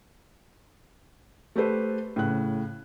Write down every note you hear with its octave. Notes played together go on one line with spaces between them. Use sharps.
A3 G4 A4 B4 C5
A2 C#3 F#6